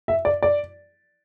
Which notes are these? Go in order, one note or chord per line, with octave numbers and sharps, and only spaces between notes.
E5
D5
D5